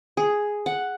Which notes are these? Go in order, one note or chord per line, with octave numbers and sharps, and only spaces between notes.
G#4
F#5